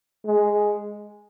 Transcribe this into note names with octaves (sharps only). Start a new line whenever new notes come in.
G#3